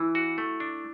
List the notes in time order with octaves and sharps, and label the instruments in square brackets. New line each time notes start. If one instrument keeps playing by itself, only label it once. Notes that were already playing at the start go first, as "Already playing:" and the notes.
Already playing: [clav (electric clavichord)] E3 [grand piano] E4
[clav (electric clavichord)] F#4
A3
D4